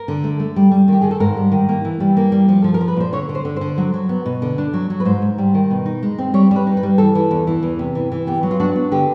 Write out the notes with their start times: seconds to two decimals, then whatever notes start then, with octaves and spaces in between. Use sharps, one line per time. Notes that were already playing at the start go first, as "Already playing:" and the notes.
Already playing: A#4
0.08 D3
0.24 A3
0.40 A3
0.56 G3
0.71 G3
0.88 D#3 G4
1.01 D#3 G#4
1.11 A4
1.20 G#2 A#4
1.37 G3
1.52 D#3
1.69 A#3
1.85 E3
2.00 G3
2.17 A#3
2.32 G3
2.49 F3
2.62 F3 A4
2.74 A#4
2.81 F3
2.88 B4
2.96 A#2 C5
3.13 D3 C#5
3.29 D3
3.35 C5
3.45 D3
3.56 D3 C5
3.78 F#3
3.94 F#3
4.09 B3
4.26 B2
4.42 D3
4.58 D4
4.73 F#3
4.90 F#3
5.00 B4
5.05 G#2 C5
5.22 G#2
5.38 G3
5.54 D#3
5.71 B2
5.86 D#4
6.03 G#3
6.18 C4
6.34 G3 C#5
6.51 G3 B4
6.67 D#4
6.77 B4
6.83 G3
6.98 E3 A4
7.15 E3
7.31 E2
7.47 E3
7.63 E2
7.79 C3
7.95 E3
8.12 E3
8.27 B3 G4
8.43 F#3
8.51 F4
8.60 D4 F#4
8.76 B3
8.92 D3 G4